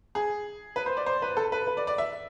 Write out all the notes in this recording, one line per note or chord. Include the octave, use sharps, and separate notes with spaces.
G#4
B4
C5
D5
C5
B4
A4
B4
B4
D5
D5
E5